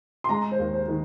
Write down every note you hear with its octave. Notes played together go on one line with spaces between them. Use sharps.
C6
G#3 A#5
C5
D#2
C5
D#3